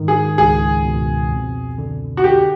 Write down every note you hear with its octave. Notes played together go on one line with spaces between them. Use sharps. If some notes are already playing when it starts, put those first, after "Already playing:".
Already playing: G#2 D#3
G#4
C#2 G#4
B2
F2
D3
F#4
D3 G4